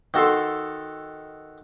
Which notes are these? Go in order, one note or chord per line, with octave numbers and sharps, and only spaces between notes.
D#3 F#4 A4 C6